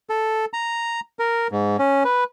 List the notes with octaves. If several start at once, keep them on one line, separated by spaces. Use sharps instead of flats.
A4
A#5
A#4
G#2
C#4
B4